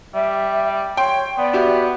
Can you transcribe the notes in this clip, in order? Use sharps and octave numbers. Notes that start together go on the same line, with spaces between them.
G3 E5
C#5 G5 C6
B3 D5
F#4 G4 E5